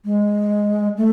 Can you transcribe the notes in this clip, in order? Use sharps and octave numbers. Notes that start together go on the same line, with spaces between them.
G#3
A3